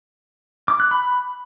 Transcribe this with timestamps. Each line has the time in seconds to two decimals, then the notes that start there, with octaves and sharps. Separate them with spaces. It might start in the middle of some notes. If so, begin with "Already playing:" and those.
0.68 D6
0.80 F#6
0.91 B5